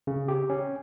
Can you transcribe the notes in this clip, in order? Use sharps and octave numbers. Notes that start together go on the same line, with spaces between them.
C#3
G4
C#4